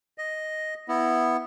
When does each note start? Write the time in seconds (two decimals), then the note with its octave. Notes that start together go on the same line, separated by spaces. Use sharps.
0.18 D#5
0.88 B3 E4